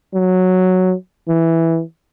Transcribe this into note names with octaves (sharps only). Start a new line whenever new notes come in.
F#3
E3